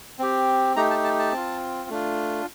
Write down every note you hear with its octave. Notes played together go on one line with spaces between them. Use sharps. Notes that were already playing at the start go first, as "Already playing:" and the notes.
C4 G4
A3 D#4 G4 A#5
A5
A5
A5
C4
F4
A3 D4 F4